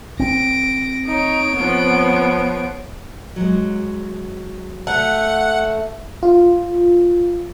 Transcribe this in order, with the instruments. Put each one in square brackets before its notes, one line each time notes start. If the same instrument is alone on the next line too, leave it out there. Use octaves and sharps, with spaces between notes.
[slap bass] C4 [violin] A#6 D7
[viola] D#4 [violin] C#5 D7
[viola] F3 B3
[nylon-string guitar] F#3 G#3
[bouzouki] A3 [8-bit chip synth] F#5
[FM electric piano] F4